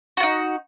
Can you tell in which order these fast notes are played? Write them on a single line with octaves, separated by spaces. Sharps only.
F#4 F4 D#4